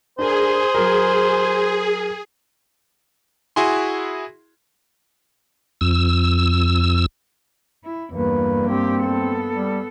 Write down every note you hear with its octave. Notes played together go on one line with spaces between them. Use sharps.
D4 G#4 A#4 C5
F#3 A#4
E4 F#4 G#4 G#5 C6
F2 E6
E4
E2 G2 A#3 B4
C4 G4
B3 A4
G3